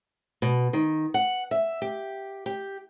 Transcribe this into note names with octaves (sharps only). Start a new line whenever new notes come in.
B2
D#3
F#5
E5
G4
G4